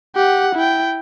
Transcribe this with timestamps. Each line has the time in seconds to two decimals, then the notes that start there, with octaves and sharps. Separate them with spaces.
0.16 G4 F#5
0.55 E4 G5